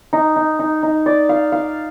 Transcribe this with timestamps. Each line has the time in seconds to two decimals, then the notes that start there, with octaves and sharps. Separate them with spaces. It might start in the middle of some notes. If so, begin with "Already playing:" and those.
0.13 D#4
0.36 D#4
0.59 D#4
0.83 D#4
1.06 D5
1.29 F5
1.52 F5